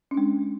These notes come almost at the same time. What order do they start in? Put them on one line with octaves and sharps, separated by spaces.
C#4 D4 G#3